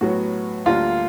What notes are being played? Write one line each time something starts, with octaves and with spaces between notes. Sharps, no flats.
A2 F#3 B3 F#4
D2 D3 G3 A#3 D4 F4